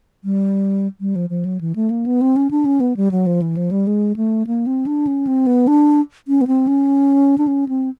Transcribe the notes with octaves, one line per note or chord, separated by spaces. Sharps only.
G3
G3
F3
F3
F#3
E3
A3
A#3
B3
C4
C#4
D4
C#4
B3
G3
F#3
F3
E3
F3
G3
G#3
A3
A#3
C4
D4
C#4
C4
B3
D4
C#4
B3
C4
C#4
D4
C#4
C4